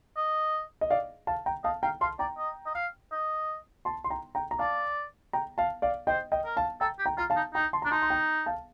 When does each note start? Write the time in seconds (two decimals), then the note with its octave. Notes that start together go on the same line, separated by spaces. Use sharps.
0.17 D#5
0.81 D#5
0.90 D5 F5
1.27 F5 A5
1.46 G5 A#5
1.64 D#5 F5 A5
1.83 F5 G5 A#5
2.01 F5 A5 C6
2.19 D5 G5 A#5
2.38 D#5
2.66 D#5
2.75 F5
3.12 D#5
3.85 A5 C6
4.04 C6
4.10 G5 A#5
4.35 G5 A#5
4.51 A#5
4.59 D5 F5 A5
5.33 G5 A#5
5.58 F5 A5
5.82 D5 F5
6.07 C5 D#5 G5
6.32 D#5 G5
6.45 A#4
6.57 F5 A5
6.81 A4 G5 A#5
6.99 G4
7.06 G5 A#5
7.18 F4 A#5
7.30 F5 A5
7.36 D#4
7.55 D#4 G5 A#5
7.73 A5 C6
7.82 D4 A#5
7.91 D#4 A5 C6
8.02 C6
8.10 G5 A#5
8.46 F5 A5